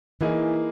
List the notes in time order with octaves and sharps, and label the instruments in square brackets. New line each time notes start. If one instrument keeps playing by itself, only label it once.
[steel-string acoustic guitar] E3 [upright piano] A#3 D#4 G#4